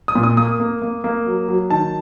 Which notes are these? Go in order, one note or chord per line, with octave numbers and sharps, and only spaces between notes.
D#6
A#2
D#6
A#3 D#6
A#3
A#3
A#3
F#3
F#3
D#3 A5